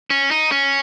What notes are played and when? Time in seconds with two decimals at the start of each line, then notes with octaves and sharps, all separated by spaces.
0.10 C#4
0.31 D#4
0.52 C#4